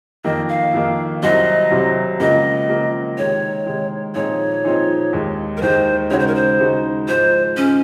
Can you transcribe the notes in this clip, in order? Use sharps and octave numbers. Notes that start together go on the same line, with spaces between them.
F2 D#3 A#3 D#5
F5
F2 D#3 A#3
C2 C3 F#3 C4 D#5
C2 C3 F#3 C4
C#2 C#3 F3 A#3 D#5
C#2 C#3 F3 A#3
C3 D#3 G#3 C#5
C3 D#3 G#3
A#2 F3 C4 D#4 G#4 C#5
A#2 F3 C4 D#4 G#4
D#2 D#3 G#3
A#4
D#2 D#3 G#3 C5
C#3 G#3 D#4 F#4 C#5
C5
A#4
C5
C#3 G#3 D#4 F#4
G#2 F3 G#3 C5
G#2 F3 G#3 C#4